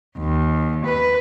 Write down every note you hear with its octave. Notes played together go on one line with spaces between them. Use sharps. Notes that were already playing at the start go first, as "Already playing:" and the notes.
D#2
B4